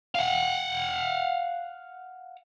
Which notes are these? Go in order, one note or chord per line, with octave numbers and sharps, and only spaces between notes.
F5 F#5